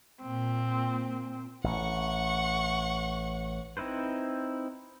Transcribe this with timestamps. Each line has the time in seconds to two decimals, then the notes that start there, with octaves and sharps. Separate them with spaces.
0.21 A#2 C4
1.64 A1 F#5 C#6
3.77 C4 D#4 E4 B4 C5